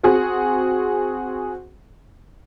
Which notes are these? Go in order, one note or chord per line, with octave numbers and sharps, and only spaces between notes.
C4 F#4 G#4